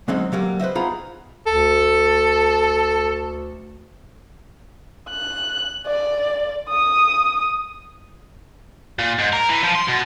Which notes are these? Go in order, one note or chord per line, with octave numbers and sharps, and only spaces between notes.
D3 F#3 G#3 C4 C#4 D#4
D3 F#3 G3 A#3
B4 C5 D#5 E5
B3 D#4 F4 G#4 A#5 B5
D2 A4
F#6
D5
D#6
A#2
G#2
A#4
E3
F3
C6
B2